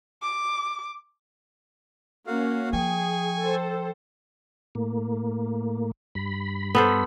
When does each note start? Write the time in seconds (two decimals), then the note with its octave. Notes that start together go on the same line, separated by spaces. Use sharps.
0.22 D6
2.27 A#3 C#4 F#4 F5
2.73 F3 G#4 G5 G#5 C#6
3.39 A4 C5
4.75 A2 A#3
6.15 G2 B5
6.75 B3 A4 C5